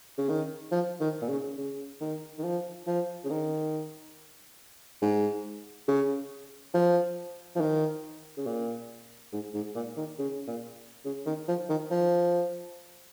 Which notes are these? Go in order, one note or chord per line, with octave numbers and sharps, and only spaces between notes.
C#3
D#3
F3
D#3
A#2
C#3
C#3
D#3
D#3
F3
F3
C#3
D#3
G#2
C#3
F3
F3
D#3
C#3
A#2
G#2
G#2
A#2
D#3
C#3
A#2
C#3
D#3
F3
D#3
F3